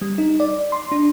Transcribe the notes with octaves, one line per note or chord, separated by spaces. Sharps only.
G3
D#4
D5
C6
D4